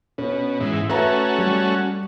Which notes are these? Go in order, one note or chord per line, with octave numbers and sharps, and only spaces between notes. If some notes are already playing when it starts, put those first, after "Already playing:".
B2 C#4
G#2 E3
A3 C#4 F#4 B4 E5 A#5
G3